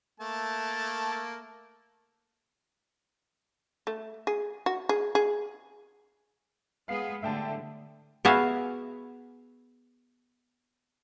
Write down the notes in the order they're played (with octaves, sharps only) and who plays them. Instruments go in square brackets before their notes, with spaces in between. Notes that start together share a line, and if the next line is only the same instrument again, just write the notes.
[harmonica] A3 A#3 A5
[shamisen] A3
G#4
F#4
G#4
G#4
[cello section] G#3 B3 G#4 [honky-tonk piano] F5 C7
[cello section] A2 D3 G3 [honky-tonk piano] E5 G5 A5
[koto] B3 F#4 G#4 E5 F5